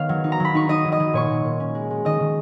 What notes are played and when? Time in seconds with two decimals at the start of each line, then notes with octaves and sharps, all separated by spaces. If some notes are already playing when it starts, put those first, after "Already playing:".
Already playing: D#3 B3 C#5 D#5 F5 F6
0.09 F#3
0.24 D#4
0.32 A#5
0.40 F#3 B5
0.55 D#4 C#6
0.69 D#4 D#5 D#6
0.85 F#3
0.92 D#5 D#6
1.00 F#3
1.13 A#2 C#5 C#6
1.30 A#2
1.45 A#2
1.60 C#4
1.75 G#3
1.90 G#3
2.05 D#3 D#5 D#6
2.20 D#3